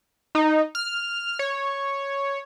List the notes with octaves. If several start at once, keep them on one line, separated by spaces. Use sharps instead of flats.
D#4
F6
C#5